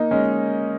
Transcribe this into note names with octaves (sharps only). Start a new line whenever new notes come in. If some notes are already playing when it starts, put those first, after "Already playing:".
Already playing: A#3 D#4
G#3 C#4